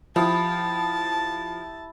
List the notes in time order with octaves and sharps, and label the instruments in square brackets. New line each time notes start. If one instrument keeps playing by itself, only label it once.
[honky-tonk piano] F3 [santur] E4 G4 D#6 [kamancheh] A5